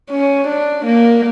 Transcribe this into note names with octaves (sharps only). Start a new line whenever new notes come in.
C#4
D4
A#3